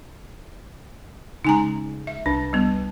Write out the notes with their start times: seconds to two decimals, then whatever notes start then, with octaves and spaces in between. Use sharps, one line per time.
1.45 C#3 G#3 D#4 G#5 A#5
2.07 E5
2.26 C2 D4 B4 A5
2.53 G3 B3